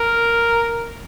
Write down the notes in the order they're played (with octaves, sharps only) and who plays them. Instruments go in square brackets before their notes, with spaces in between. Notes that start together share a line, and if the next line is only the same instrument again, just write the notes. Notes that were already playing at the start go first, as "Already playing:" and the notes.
Already playing: [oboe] A#4